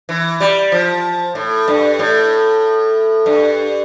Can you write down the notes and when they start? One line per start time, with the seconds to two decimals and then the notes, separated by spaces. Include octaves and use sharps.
0.09 E3
0.40 G3
0.72 F3
1.35 A2
1.68 G2
1.99 A2
3.26 G2